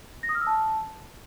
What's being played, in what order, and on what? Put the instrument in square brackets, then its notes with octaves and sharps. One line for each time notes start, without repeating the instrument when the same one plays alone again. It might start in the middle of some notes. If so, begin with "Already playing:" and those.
[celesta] A#6
D#6
F6
E6
A5